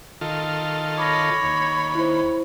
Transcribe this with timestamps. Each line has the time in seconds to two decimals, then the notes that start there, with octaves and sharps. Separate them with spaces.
0.21 D#3 F4 A4
0.98 C#5 B5 D6 A#6
1.43 D#2
1.95 E4 C5